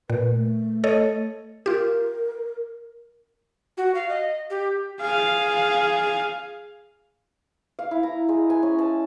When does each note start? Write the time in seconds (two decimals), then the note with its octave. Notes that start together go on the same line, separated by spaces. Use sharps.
0.10 A#2 B4
0.31 A3
0.84 A4 C#5 D#5
1.66 F4 G4 A#4
3.77 F#4
3.95 F5
4.09 D#5
4.50 G4
5.00 G#4 F5
7.79 F5
7.91 E4
8.03 A#5
8.29 G#3
8.50 G#5
8.63 C#4
8.79 A5